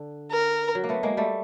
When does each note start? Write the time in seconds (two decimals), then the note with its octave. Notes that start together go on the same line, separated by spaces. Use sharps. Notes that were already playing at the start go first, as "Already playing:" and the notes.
Already playing: D3
0.31 A#4
0.75 F#3
0.84 A#3
0.89 A3 B3
1.03 G#3 A#3
1.17 G3 A3